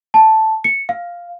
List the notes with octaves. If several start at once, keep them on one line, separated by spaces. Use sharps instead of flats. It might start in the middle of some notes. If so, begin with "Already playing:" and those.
A5
C#7
F5